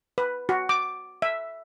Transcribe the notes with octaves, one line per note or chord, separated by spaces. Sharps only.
B4
F#4
D6
E5